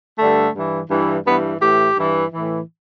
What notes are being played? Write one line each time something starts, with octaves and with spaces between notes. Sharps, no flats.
G2 D3 A3
G2 E3
G2 E3
G2 E3 B3
A2 E3 G4
G2 E3
A2 E3